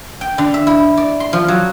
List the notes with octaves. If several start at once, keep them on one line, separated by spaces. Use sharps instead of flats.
G5
D3
E5
E4
D5
C6
F3
F#3